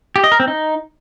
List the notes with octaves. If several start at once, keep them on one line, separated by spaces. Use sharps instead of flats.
G4
D#5
A#4
C4
D#4